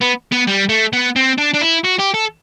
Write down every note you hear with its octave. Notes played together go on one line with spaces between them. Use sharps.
B3
B3
G3
A3
B3
C4
D4
D4
E4
F#4
G4
A4